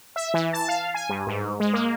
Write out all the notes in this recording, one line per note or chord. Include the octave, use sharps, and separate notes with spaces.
E5
E3
A5
F5
G#5
G2
G#2
G#3
A#3